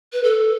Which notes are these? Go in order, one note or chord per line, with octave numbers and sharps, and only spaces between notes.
B4
A4